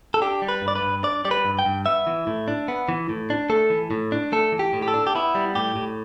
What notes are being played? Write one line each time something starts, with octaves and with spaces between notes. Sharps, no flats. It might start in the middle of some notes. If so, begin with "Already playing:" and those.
A4
D4 G4
G3
B4
G2
D5
B4
G2
D4 D5
G3 D5
B4
G2
G5
G2
B3 E5
E3
A2
D4
B3
E3
A2
D4
A3 A4
E3
A2
D4
A3 A4
E3
G4
A2
G4
A4
D4
G4
B3 E4
G3
A2 G4
A2